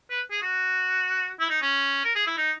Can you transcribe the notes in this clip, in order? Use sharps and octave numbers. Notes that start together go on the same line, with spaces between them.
B4
G#4
F#4
E4
D#4
C#4
A#4
G#4
E4
D#4